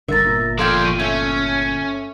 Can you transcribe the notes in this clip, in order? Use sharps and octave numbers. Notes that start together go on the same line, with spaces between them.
G1 G2 D3 A#4 E5 A#5 A6
G1 A#2
F3 A4 D5 F5 G5 C6 G#6
C#6 D#7
A3 C#4